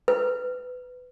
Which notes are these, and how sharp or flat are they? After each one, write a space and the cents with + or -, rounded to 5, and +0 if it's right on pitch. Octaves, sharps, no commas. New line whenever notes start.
B4 +20